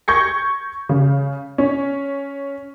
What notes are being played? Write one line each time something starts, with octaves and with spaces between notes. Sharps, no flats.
C#6 G6 G#6 A#6 C#7
C#3
C#4